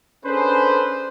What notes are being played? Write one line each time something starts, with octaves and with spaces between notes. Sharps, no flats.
C#4 D4 G#4 A4 B4 C5